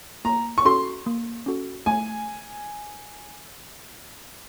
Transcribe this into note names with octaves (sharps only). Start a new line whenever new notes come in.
A#3 A#5
C#6
C#4 F#4 A4 C6
A#3
C#4 F#4 A4
A3 G#5